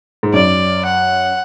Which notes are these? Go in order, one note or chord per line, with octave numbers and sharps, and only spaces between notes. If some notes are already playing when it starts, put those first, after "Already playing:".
G#2
F#2 D5
F#5